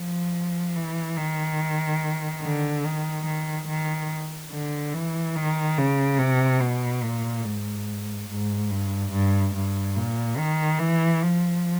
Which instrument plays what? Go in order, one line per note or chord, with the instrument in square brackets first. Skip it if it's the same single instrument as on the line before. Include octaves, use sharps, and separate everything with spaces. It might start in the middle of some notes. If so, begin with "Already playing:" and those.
Already playing: [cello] F3
E3
D#3
D3
D#3
D#3
D#3
D3
E3
D#3
C#3
C3
B2
A#2
G#2
G#2
G2
G2
G2
A#2
D#3
E3
F3